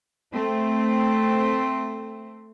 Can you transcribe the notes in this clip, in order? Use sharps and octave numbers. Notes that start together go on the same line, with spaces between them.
A3 C4